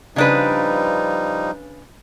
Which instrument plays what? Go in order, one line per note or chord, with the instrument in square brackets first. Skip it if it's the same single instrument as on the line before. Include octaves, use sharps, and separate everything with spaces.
[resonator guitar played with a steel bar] C#3 D4 B4 [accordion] F3 G3 D#4